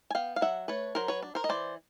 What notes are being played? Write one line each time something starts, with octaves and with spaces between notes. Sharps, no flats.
G#5
B3 F5 G5
F5
F#3 E5 F#5
A3 B4 C#5
F#3 A#4 C5
B4 C#5
D4
A#4 C5
D#5
E3 C5 D5